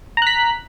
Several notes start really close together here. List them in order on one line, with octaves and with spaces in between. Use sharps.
A#5 F#6 B6